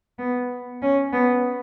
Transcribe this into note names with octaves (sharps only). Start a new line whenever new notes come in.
B3
C#4
B3